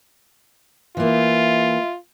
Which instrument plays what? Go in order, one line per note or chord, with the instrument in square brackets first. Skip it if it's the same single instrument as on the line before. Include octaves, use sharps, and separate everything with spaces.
[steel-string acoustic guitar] E3 A#3 [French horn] F4 [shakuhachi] E5